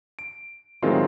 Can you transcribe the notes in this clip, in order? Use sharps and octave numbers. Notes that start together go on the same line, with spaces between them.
D7
A2 D#3 F#3 G#3 C4 F4